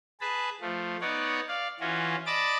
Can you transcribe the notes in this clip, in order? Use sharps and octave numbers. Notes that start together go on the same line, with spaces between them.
G#4 B4 A5 B5
F3 A3
B3 D#4 C#5 D5 F#5
D5 F5
E3 C#4 F4 F#4
D5 D#5 A5 B5 D6 A6